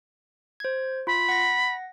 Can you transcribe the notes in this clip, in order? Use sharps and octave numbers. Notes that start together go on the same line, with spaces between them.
C5 G#6
F4 B5
F#5 A#6